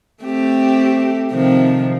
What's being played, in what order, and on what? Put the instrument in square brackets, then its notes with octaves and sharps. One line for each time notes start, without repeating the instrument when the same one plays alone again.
[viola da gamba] A3 C4 G4
C3 D#3 F3